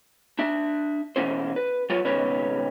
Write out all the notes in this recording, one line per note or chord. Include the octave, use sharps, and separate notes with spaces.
D4 E5
B2 E3 C#4 E4 C5
B4
F#3 F4 B4 C#5
C#2 B2 D#3 C#4 B4 C#5